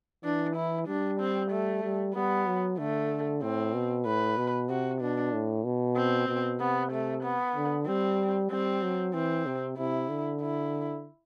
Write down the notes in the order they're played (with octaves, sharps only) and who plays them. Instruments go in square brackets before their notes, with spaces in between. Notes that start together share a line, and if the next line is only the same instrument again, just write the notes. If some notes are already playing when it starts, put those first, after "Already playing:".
[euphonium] E3 [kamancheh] D4
[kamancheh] E4
[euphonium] G3 [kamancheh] D4
[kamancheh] C4
A3
[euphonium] G3
[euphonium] G3 [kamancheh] B3
[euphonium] F#3
[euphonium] D3 [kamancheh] A3
[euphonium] A2 [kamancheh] C4
[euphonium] B2
[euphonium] A2 [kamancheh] B4
[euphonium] B2
[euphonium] C3 [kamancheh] F#4
[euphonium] B2 [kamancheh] D4
[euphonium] A2
B2
[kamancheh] C4
[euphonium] B2
[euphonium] C3 [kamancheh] B3
[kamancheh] A3
B3
[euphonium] D3
[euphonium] G3 [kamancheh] C4
[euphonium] G3 [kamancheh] C4
[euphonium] F#3
[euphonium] E3 [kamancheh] C4
[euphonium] C3
[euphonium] C3 [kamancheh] E4
[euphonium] D3
[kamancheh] E4